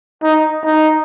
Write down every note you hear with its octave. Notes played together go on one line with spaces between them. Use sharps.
D#4
D#4